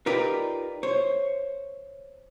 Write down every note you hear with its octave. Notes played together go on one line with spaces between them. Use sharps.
D#4 F4 G4 A#4 B4 D5
C5 C#5